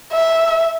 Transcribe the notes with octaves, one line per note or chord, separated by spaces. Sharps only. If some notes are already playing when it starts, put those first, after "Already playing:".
E5